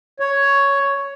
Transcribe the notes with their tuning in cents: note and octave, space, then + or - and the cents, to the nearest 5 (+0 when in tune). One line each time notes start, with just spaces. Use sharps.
C#5 +5